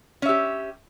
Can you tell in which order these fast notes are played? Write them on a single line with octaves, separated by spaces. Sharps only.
C#4 E5 G4